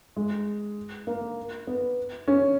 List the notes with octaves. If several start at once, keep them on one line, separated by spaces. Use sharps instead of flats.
G#3
A#3
B3
C#4